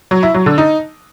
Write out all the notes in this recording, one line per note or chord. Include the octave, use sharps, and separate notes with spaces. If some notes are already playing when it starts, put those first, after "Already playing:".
F#3
E4
F#3
D3
D#4